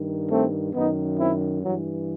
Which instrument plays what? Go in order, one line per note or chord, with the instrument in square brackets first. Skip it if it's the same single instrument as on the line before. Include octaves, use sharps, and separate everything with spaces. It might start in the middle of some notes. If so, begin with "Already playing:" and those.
Already playing: [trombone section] G2 D#3
A3 C4
F#2 D#3 B3 D#4
C4 E4
G2 E3 F#3